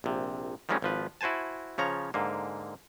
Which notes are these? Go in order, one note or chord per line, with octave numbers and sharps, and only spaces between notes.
A#1 C3
D#3 F3 G3 G#3 C4 C#4
G#1 F3 B4
E4 F#4 C5 G#5 A5
C#3 F3 C#5 A#5
G#2 D3 A#3